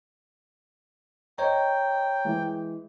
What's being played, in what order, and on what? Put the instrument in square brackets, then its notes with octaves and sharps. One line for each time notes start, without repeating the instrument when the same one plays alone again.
[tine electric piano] C5 C#5 A#5 [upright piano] D#5 [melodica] G5
[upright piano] E3 G#3